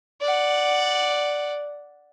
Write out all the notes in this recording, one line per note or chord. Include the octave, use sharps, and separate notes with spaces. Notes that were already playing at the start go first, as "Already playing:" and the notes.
D5 F#5